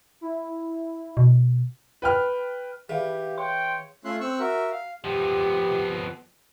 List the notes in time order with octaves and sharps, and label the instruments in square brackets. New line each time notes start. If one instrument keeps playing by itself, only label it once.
[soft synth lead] E4
[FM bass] B2
[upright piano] B4 G5 F6
[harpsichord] E3 [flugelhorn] G4 [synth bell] G#4 F5
[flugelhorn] C#5 [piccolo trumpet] G5 [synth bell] C6
[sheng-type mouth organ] A3 C#4 F4 E5 C6 F#6
C4 C#6 E6 F#6
F#4 A#4 E5
F5
[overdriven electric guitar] F3 B3 [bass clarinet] G4